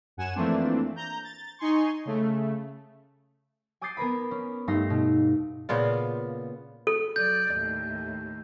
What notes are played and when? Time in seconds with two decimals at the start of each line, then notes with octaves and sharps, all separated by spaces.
0.17 F#2 F#5 G#5 E7
0.35 E3 F3 A3 A#3 C4 D4
0.96 A#5 G6
1.24 A6
1.59 D#4 G#5 C6 C#6
2.05 C#3 A3
3.81 G#5 D6 D#6 G6 A6 C7
3.97 B3 A#4 B4 B5
4.31 C#4
4.68 G2 A3 D#4 F5 C6 A#6
4.90 B2
5.69 A#2 C#3 B3 F4
6.87 A4
7.16 F#3 D5 G6
7.52 D#2 A2